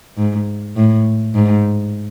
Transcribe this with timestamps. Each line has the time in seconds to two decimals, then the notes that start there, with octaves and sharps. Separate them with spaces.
0.17 G#2
0.76 A2
1.35 G#2